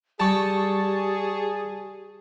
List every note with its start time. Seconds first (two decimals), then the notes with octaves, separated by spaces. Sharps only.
0.20 G3 G4 G#4 A5 C#6